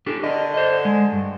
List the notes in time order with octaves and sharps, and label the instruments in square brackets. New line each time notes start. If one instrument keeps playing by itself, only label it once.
[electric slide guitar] D4 G4 A4
[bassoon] D3 [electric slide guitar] A#4 D#5
[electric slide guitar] C5 D#5
G#3
G2